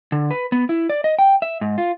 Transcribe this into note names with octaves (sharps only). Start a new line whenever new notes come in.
D3
B4
B3
E4
D5
D#5
G5
E5
G#2
F4